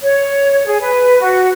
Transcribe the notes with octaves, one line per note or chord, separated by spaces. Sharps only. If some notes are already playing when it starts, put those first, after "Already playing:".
C#5
G#4
B4
F#4